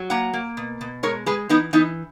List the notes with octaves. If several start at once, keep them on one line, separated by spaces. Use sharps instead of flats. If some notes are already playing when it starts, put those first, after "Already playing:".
Already playing: F#3
A#3 F#5 A#5
A#3
B2
B2
G#3 A#4 C#5
G#3 G#4 B4
E3 B3 D#4
E3 B3 D#4